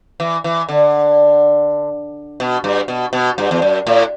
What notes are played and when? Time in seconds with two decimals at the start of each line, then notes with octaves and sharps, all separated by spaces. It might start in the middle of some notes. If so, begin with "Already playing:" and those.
0.20 E3
0.44 E3
0.69 D3
2.40 B2
2.64 G2
2.88 B2
3.13 B2
3.38 G2
3.51 E2
3.62 F#2
3.87 A2